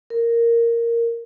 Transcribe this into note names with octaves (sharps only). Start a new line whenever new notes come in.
A#4